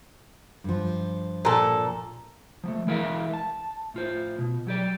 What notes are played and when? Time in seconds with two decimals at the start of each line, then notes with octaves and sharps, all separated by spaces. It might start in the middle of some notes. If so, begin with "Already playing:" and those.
0.64 G2 F3
1.45 A#2 A4
2.64 F3 F#3 A3
2.87 E3 G#3 E4 A#4 E5 F5
3.33 A5
3.94 A2 F4 C5
4.39 B2
4.67 F#3 G4 D5